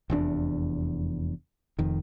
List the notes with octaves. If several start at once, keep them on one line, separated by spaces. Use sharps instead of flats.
F1 E2 D4
F1 F2 D#3